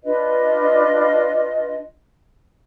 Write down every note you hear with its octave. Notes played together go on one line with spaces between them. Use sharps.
D4 F4 B4 D#5